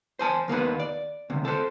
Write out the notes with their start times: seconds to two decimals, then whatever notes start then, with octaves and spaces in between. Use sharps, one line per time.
0.19 C5 G#5 A5
0.48 D#2 A#3 B3 B4
0.80 D5
1.30 D2 C3
1.45 A4 C5